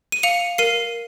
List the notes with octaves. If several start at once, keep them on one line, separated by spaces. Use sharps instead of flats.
D#7
F5 C#7 F7
A#4 C7 D#7